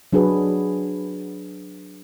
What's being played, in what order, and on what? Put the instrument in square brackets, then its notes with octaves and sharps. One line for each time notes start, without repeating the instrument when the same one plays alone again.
[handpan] F#3 D4 F#4 G#4 B4